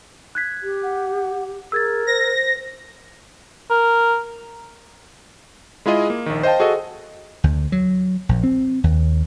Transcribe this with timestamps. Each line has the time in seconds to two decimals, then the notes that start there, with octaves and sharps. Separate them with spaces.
0.35 F#6 G#6 B6
0.62 G4
0.83 F#5
1.72 G#4 A#4 E6 G#6 A6
2.07 C5 A#6
3.70 A#4
5.86 G#3 E4 F4 G#4 D#5
6.10 A#3
6.26 A#1 D#3
6.43 C5 D#5 F5 G5 A5
6.60 F#4 G#4 A4 D#5
7.44 D2
7.72 F#3
8.29 A#1
8.44 C4
8.84 D#2